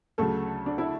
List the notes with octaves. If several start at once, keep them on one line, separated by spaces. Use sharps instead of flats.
D2 C#3 F#3 A3 A4
D4
E4